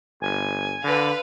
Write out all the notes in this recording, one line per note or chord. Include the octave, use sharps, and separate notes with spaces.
G1 G#5
D3 B4 F5